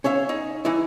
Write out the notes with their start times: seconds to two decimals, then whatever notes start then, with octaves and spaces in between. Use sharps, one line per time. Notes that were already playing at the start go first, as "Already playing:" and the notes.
0.04 C#4 C#5 E5 F5
0.29 D#4
0.65 E3 D#4 E4